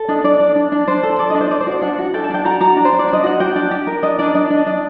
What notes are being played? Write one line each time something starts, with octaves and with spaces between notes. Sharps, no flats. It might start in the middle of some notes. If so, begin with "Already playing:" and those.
Already playing: A4
D4 D#5
D4 D5
D4
D4
D4
D4 C5
A4
A4 D5
D#5
D4
C5
D4 D5
C5
F#4 D5
D4 F#5
F#4
A4 G5
A5
D4 G5
F#4 A#5
F#4 A#5
D4
C5
D4
D5
D4
D#5
F#4 F#5
F#4 G5
D4
G4
A#4
D4 D#5
D4 D5
D4 D#5
D4
D4 D#5